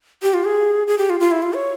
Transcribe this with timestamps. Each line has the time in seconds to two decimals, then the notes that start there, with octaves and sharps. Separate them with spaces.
0.23 G4
0.34 F4
0.45 G#4
0.87 G#4
0.98 G4
1.10 F4
1.20 F4
1.32 E4
1.43 F4
1.54 C#5